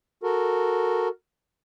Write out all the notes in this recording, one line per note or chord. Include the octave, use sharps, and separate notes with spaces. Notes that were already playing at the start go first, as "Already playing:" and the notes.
F#4 A4 A#4